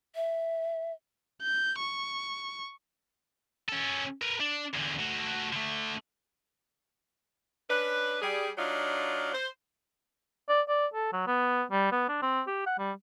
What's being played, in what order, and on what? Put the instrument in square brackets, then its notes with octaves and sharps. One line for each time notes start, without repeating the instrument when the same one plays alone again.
[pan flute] E5
[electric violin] G6
C#6
[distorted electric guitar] C#4 A4
A#4 B4
D4
E2 D3
A3 F#4
D3 A3
[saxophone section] C#4 D4 B4
G3 G#4
F#3 D4 D#4 F4
C5
[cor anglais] D5
D5
A4
F#3
B3
G3
B3
D4
C4
G4
F#5
G3